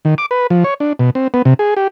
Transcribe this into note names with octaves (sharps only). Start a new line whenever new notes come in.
D#3
D6
B4
F3
C#5
D4
B2
C4
B3
C3
G#4
G4